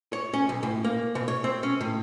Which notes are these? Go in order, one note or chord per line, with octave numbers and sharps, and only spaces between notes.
C#5
C#4
B1
A2
A#3
B2
C#5
C4
C#4
A2